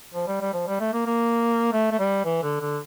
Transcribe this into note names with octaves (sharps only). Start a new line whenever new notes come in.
F3
G3
G3
F3
G3
A3
A#3
A#3
A3
A3
G3
E3
D3
D3